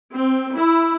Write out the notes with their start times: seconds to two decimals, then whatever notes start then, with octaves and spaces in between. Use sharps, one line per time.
0.15 C4
0.55 E4